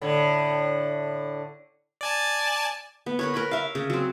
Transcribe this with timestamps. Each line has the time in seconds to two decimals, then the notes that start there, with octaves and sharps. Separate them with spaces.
0.02 A2 D3
2.01 D5 G#5 A5
3.06 B3
3.19 A#4 B4 C#5
3.34 A#4 B4 C#5 B5
3.51 A#4 E5 F5
3.75 C#3
3.90 F#3 C4